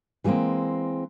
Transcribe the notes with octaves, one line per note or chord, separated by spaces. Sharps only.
E3 G3 G#3 A#3 C4